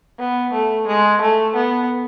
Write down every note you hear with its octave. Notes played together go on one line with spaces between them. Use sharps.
B3
A3
G#3
A3
B3